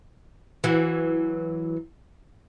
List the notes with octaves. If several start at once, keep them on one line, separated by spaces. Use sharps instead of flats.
E3 F#3